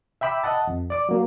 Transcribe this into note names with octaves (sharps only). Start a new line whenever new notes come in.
E5 G5 B5 D6 E6
D#5 F#5 A5
F2
D5 D6
F#3 A#3